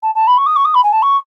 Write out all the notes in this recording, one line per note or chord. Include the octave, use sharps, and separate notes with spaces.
A5
A5
B5
C#6
D#6
C#6
D#6
B5
G#5
A5
C#6